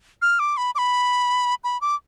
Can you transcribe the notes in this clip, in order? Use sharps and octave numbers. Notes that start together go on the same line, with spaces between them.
F6
D6
B5
D6
B5
B5
D6